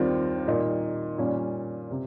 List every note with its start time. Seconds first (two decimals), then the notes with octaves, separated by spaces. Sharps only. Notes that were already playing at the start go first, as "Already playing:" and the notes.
Already playing: D#2 D#3 G3 C4 F4
0.47 A#2 G3 A#3 D#4
1.18 A#2 G3 C#4
1.91 C3